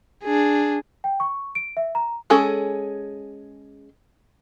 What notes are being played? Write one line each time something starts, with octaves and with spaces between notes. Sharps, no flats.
D4 G#4
G5
C#6
D7
E5
A#5
G#3 C#4 G#4 A4